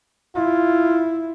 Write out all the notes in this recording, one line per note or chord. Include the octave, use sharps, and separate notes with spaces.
E4 F4